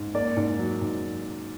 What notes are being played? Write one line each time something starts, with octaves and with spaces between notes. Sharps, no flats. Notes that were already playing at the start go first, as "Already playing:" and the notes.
Already playing: G#2
A#3 D5
G#2
F#3
G#2